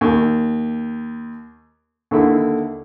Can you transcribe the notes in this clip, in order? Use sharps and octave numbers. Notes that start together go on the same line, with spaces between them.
D#2
D#2 D3 E4